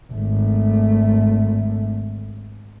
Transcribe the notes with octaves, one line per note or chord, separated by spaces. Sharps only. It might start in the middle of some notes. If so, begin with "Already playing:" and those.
G#1 A3